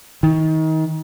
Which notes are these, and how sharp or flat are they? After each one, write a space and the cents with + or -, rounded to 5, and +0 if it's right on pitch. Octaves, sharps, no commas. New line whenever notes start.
D#3 +30